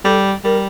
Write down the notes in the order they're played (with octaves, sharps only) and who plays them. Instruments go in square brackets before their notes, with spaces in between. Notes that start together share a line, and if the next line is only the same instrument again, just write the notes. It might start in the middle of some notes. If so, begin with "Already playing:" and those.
[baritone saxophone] G3 [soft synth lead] A4
[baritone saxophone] G3 [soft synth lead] A#4